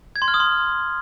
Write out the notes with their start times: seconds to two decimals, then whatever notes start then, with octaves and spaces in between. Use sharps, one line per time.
0.16 G#6
0.22 C6
0.28 F6
0.34 D#6
0.40 C6